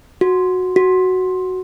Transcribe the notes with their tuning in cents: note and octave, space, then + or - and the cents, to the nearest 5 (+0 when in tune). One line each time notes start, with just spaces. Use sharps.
F#4 -10
F#4 +5